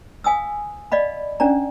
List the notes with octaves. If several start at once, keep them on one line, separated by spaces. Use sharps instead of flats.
F5 G#5 D#6 E6
D5 D#5 F5 B5
C#4 D4 D5 A#5